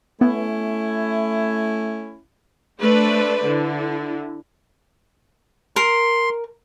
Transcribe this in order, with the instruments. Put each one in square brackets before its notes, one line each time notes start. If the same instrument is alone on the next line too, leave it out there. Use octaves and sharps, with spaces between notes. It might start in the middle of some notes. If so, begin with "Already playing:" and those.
[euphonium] A3 [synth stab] B3 [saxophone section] C#4 E4
[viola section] A3 D4 B4 C5 D5
D3 E4
[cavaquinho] A#4 [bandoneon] C6